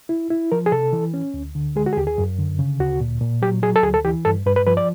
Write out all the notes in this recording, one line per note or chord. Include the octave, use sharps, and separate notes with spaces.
E4
E4
F3 A#4
G#4
C3 A4
E3
C#4
D2
D3
G#3 G#4
F#4
G#4
D#2 G4
G#4
F#2
D3
C#3
D2 F#4
A#2
A#2
F#3 G4
F#3 G#4
A4
D2 G#4
A4
E3 G4
G2 A4
G2 B4
B4
F3 B4
D5